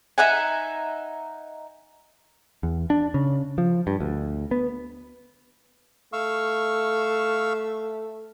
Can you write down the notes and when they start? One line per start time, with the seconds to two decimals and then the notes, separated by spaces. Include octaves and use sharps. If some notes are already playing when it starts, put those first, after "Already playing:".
0.18 D#4 E5 F#5 G#5
2.63 E2
2.90 D4
3.14 C#3
3.58 F3
3.87 G2
4.00 D2
4.51 B3
6.13 A3 F5 C#6 E6